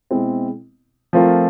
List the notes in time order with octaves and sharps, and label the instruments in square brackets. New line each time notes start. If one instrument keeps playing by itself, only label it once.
[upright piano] B2 G#3 C4 E4
F3 A3 C4 F4 A#4